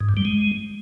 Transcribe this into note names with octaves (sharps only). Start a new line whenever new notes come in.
G#2
G2
G3
G#3